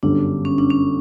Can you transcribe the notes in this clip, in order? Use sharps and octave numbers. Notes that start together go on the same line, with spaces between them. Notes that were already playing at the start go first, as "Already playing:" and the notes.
G1 F#2 D3 G3 D4
C#4
D4
C#4